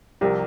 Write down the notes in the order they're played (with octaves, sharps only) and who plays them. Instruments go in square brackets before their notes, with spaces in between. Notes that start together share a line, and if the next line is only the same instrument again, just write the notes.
[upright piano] C2 C3 F3 [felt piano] G4 A#4